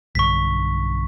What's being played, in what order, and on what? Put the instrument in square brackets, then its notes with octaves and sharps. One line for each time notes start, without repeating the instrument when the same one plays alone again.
[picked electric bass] B1 G2 D3 [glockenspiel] C#6 B6